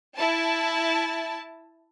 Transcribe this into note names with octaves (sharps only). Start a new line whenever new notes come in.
E4 A5